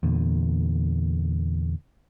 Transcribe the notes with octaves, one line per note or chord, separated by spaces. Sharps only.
E2 A#2 D3